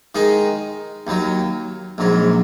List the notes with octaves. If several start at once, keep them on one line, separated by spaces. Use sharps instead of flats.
D#3 G#3 D#4 G#4
D#2 D#3 F#3
A#1 G#2 F#3